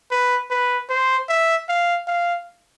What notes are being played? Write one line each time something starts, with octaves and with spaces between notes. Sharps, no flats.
B4
B4
C5
E5
F5
F5